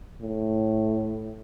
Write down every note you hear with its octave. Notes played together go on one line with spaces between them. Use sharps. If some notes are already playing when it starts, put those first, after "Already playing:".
A2